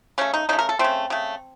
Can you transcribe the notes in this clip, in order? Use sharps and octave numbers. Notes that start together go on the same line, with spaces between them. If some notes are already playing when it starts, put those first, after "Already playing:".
C#3 A3 C#4
D#4
C#3 A3 D#4
A#4
A4
C#3 A3 C4
C#3 A3